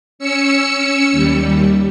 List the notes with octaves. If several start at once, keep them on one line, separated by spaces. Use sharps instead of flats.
C#4 E6 C#7
D#2 G3